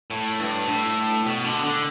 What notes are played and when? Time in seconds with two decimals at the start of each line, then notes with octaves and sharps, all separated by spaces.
0.10 A2
0.40 G2
0.68 A2
1.26 B2
1.44 D3
1.64 D3